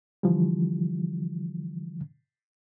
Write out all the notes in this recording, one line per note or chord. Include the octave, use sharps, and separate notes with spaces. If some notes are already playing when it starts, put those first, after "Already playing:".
D3 E3 F3 G3